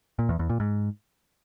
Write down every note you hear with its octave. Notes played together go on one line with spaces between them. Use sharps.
A#2
E2
E2
A#2
G#2